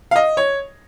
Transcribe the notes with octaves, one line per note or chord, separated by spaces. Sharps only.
F5
D#5
C#5